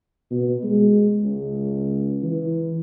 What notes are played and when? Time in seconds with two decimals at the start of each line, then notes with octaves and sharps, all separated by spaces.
0.31 B2
0.64 G#3
1.22 C#2
2.23 E3